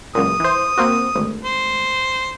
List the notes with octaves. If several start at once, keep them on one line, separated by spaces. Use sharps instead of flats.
C#2 F#2 A#2 D#6
E3 C5
A#3 C4 F#4
G#1 D2
C5